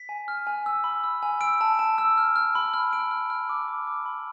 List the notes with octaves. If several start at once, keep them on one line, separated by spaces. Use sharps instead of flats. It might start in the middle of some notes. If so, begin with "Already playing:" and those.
Already playing: B6
G#5
F6
G#5
E6
B5
E6
G#5
E6 D7
A5
A5
E6
F6
F6
B5
F6
F6 D7
F6
F6
D6
D6
D6
B5